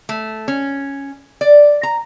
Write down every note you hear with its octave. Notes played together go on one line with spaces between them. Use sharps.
A3
C#4
D5
A#5